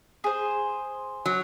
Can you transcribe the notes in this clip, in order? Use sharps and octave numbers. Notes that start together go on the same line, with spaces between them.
G#4 C5
F#3